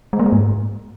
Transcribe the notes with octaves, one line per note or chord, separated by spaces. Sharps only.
G#3
A#3
G#3
G#2